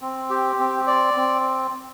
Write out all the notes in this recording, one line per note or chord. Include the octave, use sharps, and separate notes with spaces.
C4
G4
C4
D5
C4